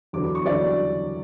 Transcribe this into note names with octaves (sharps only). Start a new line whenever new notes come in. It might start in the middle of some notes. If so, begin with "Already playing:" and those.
E2 D3 F#3 B3 D6
D6
C#6
E2 D3 F#3 B3 D5